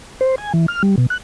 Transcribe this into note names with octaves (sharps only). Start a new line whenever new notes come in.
C5
G#5
E3
F6
G3
B2
F#6